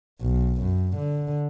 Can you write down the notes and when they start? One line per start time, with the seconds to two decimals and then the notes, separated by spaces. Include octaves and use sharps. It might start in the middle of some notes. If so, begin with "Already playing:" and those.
0.22 B1
0.62 F#2
0.97 D3